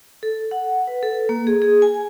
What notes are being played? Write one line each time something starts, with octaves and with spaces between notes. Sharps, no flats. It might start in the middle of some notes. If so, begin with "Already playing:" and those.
A4
F#5
B4
A4
A#3
G#4
G#4
G#5